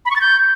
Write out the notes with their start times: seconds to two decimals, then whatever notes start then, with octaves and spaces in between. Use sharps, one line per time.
0.05 B5
0.11 C#6
0.16 A6
0.21 G6